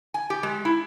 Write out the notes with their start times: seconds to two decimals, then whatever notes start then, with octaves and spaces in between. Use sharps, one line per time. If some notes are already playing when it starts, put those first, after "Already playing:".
0.14 G#5
0.30 G4
0.43 G#3
0.65 E4